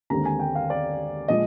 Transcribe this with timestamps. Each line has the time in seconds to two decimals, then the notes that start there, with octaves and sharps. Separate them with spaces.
0.10 D#2 D3 G#3 C4 A#5
0.25 G#5
0.40 G5
0.55 F5
0.70 D5
1.28 A#2 F3 G#3 D#5